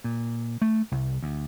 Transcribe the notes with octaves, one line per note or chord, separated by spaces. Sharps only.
A#2
A3
C2
D2